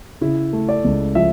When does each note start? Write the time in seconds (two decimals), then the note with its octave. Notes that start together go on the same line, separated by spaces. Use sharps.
0.21 C#3 E4
0.53 A3
0.69 D5
0.84 C#2
1.15 F3 E5